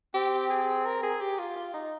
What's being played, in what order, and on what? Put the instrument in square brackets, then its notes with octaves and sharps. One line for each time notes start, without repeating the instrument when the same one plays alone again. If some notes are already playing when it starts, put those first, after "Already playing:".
[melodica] C4 [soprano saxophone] G4
[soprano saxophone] G#4
A#4
G#4
G4
F4
F4
D#4